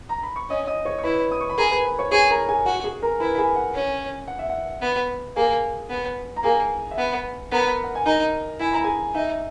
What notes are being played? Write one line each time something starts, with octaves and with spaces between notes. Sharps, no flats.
A#5
B5
C#6
C#4 D#5 D#6
D#5 D#6
C#5 C#6
C#6
E4 B4 B5
D#6
C#6
B5
G#4 A#4 A#5
B4 B5
B4 B5
C#5 C#6
G#4 C#5 C#6
A#4 A#5
G#4 G#5
F#4 F#5
G#4 G#5
A#4 A#5
E4 B4 B5
G#4 G#5
F#5
C#4
F#5
E5
F#5
B3
A#3 G#4 G#5
B3
A#5
A#3 G#4 G#5
E5
B3 F#5
B3 A#4 A#5
F#5
G#5
D#4 A#4 A#5
E4 G#5
A#5
G#4 G#5
D#4 E5